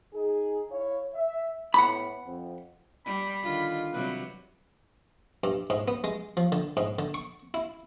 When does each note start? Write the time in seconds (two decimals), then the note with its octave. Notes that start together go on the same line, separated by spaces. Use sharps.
0.13 D#4 G#4
0.70 E4 C#5 F5
1.13 E5
1.74 A2 B3 F#5 B5
2.24 F2 C4
3.06 G3 B5
3.43 D3 D#3 F4
3.93 C3 F#3 G3 B4
5.44 G2
5.70 G#2
5.88 B3
6.04 G#3
6.37 F3
6.52 D3
6.77 G#2
6.99 D3
7.14 C#6
7.54 E4